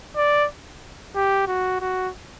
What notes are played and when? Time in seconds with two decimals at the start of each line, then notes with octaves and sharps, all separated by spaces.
0.16 D5
1.16 G4
1.47 F#4
1.81 F#4